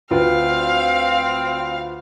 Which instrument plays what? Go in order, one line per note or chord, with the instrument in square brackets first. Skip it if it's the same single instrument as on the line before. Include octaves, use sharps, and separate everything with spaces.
[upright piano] D2 F4 B4 [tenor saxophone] C4 [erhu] F5